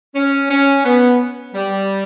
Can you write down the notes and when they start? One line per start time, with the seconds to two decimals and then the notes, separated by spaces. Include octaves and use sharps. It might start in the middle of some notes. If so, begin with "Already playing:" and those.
0.15 C#4
0.51 C#4
0.85 B3
1.55 G3